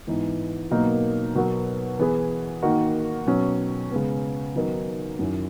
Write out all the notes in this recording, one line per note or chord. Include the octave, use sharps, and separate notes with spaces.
G#2 E3 B3 D#4
B2 F#3 A#3 D#4 A#4
B2 F#3 B3 F#4 A#4
E3 B3 E4 G#4
D#3 A#3 D#4 F#4 A#4
B2 F#3 C#4
C#3 G#3 B3
D#3 F#3 B3 D#4 A#4
F#2 D#3 F#3 C#4 E4